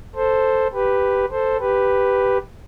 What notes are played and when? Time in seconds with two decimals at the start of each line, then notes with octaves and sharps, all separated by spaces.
0.15 A4 C5
0.73 G4 B4
1.31 A4 C5
1.59 G4 B4